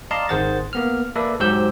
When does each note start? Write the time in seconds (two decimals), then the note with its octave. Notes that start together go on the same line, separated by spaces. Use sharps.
0.11 D5 D#5 F5 A5 A#5 C6
0.29 G#1 D#3 G#4 C5 F#5 A6
0.73 A#3 B3 F6
1.16 A#3 A4 B4 D5 E5
1.40 G#2 F#3 G4 C5 E6 G6